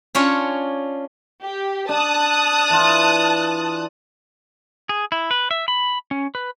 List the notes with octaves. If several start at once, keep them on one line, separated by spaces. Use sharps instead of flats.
C#4 D4 F4 C#5
G4
D4 A5 D#6 F#6
E3 F4
G#4
E4
B4
E5
B5
C#4
B4